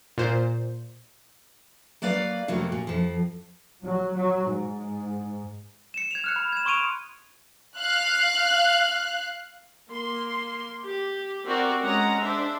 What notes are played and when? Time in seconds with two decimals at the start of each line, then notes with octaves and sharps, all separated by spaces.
0.18 A#2 C5
2.02 F#3 A#3 B4 D5 F5
2.48 F2 C3 F#3 A3 A#3
2.72 A#2
2.87 F2 F3
3.81 F#3
4.13 F#3
4.49 G#2
5.94 C#7 E7
6.11 G#6 F7
6.24 F6 F#6 C#7
6.36 B5
6.52 G#6 E7
6.65 C6 C#6 D#6 D7 D#7 F7
7.77 F5 F#6
9.89 A#3 C6
10.84 G4
11.46 C4 F#4 A#4 D5
11.82 G#3 C#4 F#5 A#5
12.21 D4 C5 E5